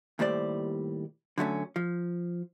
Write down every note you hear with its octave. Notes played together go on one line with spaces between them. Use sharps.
D#2 A2 G3 C5 D5
D3 F#3 A3 C#4
F3